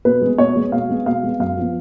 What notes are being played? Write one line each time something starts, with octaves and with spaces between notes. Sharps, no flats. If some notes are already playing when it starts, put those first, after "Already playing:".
B2 B4
G#3 B3
B2 C#5
G#3 B3
B2 F5
G#3 B3
B2 F5
G#3 B3
F#2 F5
F3 B3